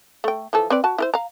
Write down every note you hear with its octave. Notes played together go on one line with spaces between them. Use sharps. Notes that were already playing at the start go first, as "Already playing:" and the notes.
A3 G5
E3 F3 A4
C4 B4 D5
F#4 A5
E4 A#4 C5
F5 A#5